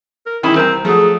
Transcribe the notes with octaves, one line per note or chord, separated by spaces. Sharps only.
A#4
D#3 E3 C#4 E4 G#4 B5
C2 C4 A#4 A#5
F3 F#3 A3 G#4